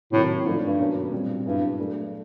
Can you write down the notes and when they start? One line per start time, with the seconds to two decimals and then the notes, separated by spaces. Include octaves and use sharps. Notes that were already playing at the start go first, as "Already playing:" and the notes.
0.12 A2 C3 D#3 F#3 A#3
0.45 G#2 F3 A3 D4 F4
0.62 G2
0.79 B2 F#3 A#3 C#4
1.12 A#2 G3 C4
1.45 G2 F#3 B3 E4 G#4
1.78 F#3 A3 D4